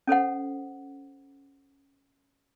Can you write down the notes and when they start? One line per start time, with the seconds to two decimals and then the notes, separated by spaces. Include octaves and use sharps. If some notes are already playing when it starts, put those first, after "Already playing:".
0.07 C#4 A4 C5 F#5